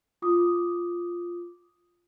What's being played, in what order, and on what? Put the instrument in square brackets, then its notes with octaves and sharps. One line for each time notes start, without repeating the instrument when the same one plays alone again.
[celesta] F4 D6 D#6